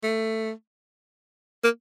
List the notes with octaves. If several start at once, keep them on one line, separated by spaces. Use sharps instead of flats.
A3
A#3